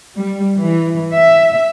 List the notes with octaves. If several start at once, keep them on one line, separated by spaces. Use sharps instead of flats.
G3
E3
E5